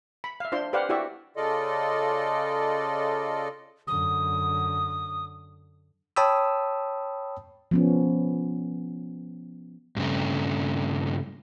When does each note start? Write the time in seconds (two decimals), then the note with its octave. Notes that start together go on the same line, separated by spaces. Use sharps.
0.24 B5
0.40 E5 F5
0.52 D4 F4 C5 C6
0.73 G4 B4 C5 D5 F5 F#5
0.89 E4 F#4 G4 D5 E5 C#6
1.36 C#3 F4 A4 D5 D#5
3.87 F#2 D3 D#6
6.16 C#5 G5 A5 B5 D#6 E6
7.71 F3 B3 C#4
9.97 G2 C#3 A3